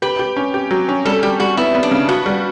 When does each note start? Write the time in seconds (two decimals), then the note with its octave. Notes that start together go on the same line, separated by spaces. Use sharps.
0.02 G4 B4
0.19 G4
0.37 C#4
0.54 G4
0.71 F#3
0.89 C#4
1.05 G3 A4
1.23 G3 G4
1.40 G3 F#4
1.57 B3 E4
1.75 B3
1.83 D4
1.91 C#3
2.09 B3 F#4
2.26 G3